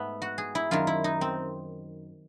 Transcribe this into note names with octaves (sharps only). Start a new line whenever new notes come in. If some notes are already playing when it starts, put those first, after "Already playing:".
Already playing: G#2 A3 B3
F#4
G#4
E4
F#2 D#3 F4
E4
D#4
C4